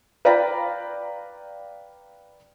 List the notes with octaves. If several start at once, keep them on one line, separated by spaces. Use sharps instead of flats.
B4 D5 F5 G5 A#5 B5